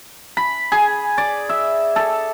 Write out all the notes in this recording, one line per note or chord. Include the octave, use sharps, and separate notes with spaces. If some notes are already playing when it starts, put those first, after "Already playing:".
B5
G#4
D5
E5
A4